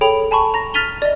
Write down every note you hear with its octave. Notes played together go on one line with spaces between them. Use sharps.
G#4 A4 C#5 G5 B5 F7
G#5 A5 B5 C#6
A#5 A#6
F6 A6 B6 D#7 F7 G7
D5 D#5